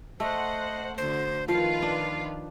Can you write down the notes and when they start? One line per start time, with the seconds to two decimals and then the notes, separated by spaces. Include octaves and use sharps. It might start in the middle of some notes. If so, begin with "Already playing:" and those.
0.20 A3 C5 D#5 F#5
0.98 D2 D3 C5
1.48 D#3 F3 F4 B4 F5
1.82 D4